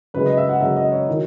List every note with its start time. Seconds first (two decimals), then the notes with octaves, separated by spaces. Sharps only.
0.14 F#2 C#3 G#3 B4
0.26 D#5
0.37 E5
0.49 F#5
0.60 F#2 C#3 G#3 E5
0.76 D#5
0.92 C#5
1.09 D#3 F#3